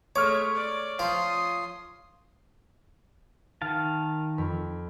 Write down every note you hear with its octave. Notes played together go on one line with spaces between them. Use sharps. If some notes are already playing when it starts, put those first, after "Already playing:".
G#3 A3 C#5 C#6 D6 F6
D5
F3 F4 C6 D#6
D#3 F5 A5
F2 B5